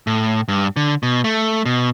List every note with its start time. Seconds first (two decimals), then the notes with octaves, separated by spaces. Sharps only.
0.07 A2
0.48 G2
0.76 D3
1.03 B2
1.24 A3
1.66 B2